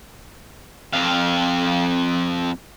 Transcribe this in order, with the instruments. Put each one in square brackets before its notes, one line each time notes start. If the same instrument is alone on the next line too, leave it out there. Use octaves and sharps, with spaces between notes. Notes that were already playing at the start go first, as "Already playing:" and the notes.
[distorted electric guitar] F2 F5